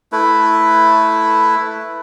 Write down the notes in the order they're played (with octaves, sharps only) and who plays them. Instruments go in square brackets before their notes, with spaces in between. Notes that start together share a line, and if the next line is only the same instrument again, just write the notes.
[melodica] A3 E4 B4